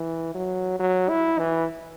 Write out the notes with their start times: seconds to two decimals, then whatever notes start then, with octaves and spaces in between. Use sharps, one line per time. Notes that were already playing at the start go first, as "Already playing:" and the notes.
Already playing: E3
0.35 F#3
0.79 F#3
1.09 E4
1.39 E3